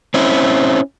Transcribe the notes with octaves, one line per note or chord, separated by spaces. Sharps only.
C4 C#4 E4